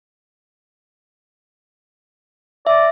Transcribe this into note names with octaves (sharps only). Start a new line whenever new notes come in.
D5 E5